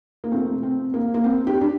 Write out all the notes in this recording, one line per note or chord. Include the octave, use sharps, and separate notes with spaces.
A#3
C3 F3 A3 C4
C4
A#3
A#3
C4
G4
D4